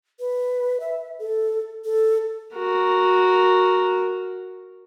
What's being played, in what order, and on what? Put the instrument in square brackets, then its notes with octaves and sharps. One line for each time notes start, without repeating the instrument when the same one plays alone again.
[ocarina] B4
E5
A4
A4
[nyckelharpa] F#4 A#4